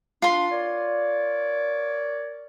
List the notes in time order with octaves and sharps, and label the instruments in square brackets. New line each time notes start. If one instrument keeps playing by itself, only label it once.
[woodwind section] D4 [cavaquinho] F4 C6
[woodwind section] A#4 C#5 D5